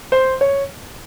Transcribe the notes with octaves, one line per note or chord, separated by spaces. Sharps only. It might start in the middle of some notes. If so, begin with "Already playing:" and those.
C5
C#5